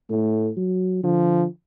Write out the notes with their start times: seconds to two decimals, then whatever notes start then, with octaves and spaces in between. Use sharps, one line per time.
0.10 A2 A3
0.57 F#3
1.03 D3 F3